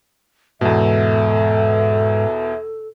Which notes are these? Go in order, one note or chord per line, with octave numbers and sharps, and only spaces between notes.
E2 G#2 B2 A4 E5